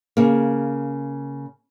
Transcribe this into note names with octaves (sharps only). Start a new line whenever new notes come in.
C#3 A#3